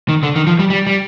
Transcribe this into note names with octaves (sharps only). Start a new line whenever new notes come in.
D#3
D3
D#3
F3
G3
G3
G3